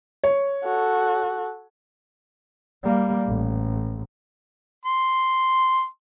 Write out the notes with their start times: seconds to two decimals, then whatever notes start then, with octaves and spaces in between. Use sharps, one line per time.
0.24 C#5
0.64 F#4 A4
2.84 G3 A#3
3.27 A1
4.86 C6